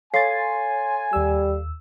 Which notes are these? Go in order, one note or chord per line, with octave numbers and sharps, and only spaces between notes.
A4 C#5 F5 G#5 C6 A6 C7
D#2 G3 E6